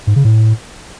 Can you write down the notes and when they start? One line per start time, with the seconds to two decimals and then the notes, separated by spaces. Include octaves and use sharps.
0.07 G#2
0.16 C#3
0.25 A2